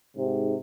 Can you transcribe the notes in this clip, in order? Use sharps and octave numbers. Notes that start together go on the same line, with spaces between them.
G#2 C3